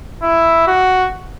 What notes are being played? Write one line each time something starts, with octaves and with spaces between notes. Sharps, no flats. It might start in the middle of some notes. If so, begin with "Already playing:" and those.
E4
F#4